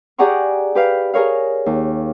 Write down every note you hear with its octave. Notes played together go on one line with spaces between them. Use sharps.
G4 G#4 D5 F#5 A#5 C#6
G4 B4 F5
G#4 A#4 C#5 F5
D#2